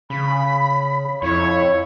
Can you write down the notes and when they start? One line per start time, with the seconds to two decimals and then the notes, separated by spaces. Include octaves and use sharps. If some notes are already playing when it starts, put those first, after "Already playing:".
0.10 C#3 B5
1.22 F2 E4 C#5